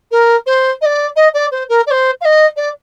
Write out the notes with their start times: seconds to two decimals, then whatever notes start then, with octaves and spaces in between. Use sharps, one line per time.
0.11 A#4
0.46 C5
0.81 D#5
0.85 D5
1.16 D#5
1.34 D5
1.51 C5
1.69 A#4
1.86 D5
1.90 C5
2.21 F5
2.25 D#5
2.56 D5